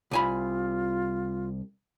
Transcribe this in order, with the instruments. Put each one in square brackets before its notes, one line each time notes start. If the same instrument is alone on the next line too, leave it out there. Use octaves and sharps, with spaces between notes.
[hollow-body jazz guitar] C2 G#5 B5 [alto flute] F4